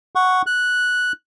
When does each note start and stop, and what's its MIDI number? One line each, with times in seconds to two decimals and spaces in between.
0.15 0.42 78
0.15 0.42 85
0.46 1.12 90